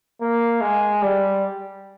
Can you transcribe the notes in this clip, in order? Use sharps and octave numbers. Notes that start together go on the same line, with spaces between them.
A#3
G#3
G3